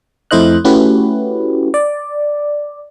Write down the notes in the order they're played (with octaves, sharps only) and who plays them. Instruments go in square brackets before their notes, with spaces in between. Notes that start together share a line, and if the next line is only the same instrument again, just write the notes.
[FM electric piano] F2 A3 E4 C5 D#5 F#6
A3 C#4 E4 F#4 G4 B4
D5